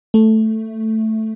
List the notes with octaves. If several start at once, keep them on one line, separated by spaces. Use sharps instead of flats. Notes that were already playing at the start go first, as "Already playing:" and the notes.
A3